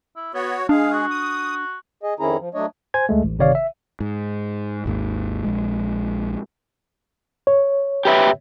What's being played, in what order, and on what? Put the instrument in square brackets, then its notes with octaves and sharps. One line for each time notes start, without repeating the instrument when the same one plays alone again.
[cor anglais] E4
[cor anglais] B3 [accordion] F#4 C#5
[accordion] G#3 G#4 [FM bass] D4 [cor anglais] F5
[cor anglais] F#4
[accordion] D#6
[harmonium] G#4 D#5
F2 D#3 C#4 E4 G#4 A#5
F3
F#3 A3 D4 C#5 D#5
[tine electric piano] C5 G#5 G#6
D2 G#3 A3
A1
G1 C3 D#3 C#5 D5 F5
E5
[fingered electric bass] G#2
G#1 D#2 G#2
A#1 G#3
[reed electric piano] C#5
[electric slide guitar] G4 B4 E5